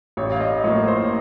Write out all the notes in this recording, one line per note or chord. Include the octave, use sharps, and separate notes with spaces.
A1 C#5
F5
D#5
A2 F3 A#3 C#5
C5